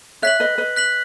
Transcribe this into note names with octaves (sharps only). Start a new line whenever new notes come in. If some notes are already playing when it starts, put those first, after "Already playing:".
C#5 E5 F#6 B6 F#7
B4 D#5
B4 D#5
F#6 B6 F#7